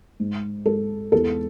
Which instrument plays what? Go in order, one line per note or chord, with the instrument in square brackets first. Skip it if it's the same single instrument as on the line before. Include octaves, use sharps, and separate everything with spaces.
[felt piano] G#2
G#2 A4
E2 A4